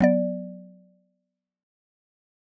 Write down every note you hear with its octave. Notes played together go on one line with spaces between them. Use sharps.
F#3 B3 D5